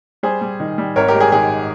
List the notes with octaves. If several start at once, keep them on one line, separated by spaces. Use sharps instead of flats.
G3 G#4 C5
G3
D#3
G3
G#1 A#4 C#5
G4 A#4
G#3
G#4
D#3 G#4